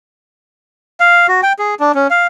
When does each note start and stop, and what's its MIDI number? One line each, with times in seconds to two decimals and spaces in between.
1.00 1.27 77
1.28 1.41 66
1.43 1.53 79
1.59 1.75 68
1.80 1.92 62
1.95 2.07 61
2.10 2.27 77